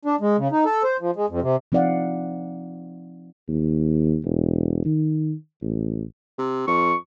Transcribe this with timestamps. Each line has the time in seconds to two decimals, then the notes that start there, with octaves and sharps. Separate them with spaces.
0.05 D4
0.21 G#3
0.38 C#3
0.51 D#4
0.65 A4
0.84 C5
1.01 F3
1.16 G#3
1.29 F2
1.42 C3
1.72 F3 C4 D#4 D5 F5 F#5
3.48 D#2
4.25 E1
4.85 D#3
5.62 A1
6.38 C3
6.67 F2 C#6